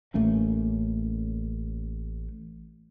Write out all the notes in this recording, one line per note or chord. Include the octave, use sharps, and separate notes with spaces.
A1 A3 A#3 C#4